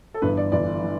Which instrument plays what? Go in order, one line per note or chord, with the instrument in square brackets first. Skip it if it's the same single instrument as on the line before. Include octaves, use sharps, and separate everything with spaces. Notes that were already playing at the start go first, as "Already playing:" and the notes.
[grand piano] A4
G1 G2 E3 B4
D5
G1 G2 E3 D5
E3